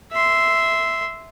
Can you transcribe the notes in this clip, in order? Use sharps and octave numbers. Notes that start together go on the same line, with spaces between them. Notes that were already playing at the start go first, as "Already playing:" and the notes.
E5 C6